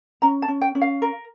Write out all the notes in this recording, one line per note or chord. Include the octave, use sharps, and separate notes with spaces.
C#4 A#5
A5
C#4
G5
C#4
F5
A#4